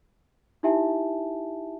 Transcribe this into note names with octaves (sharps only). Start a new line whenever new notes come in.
D#4 E4 G4 E5 G#5 A5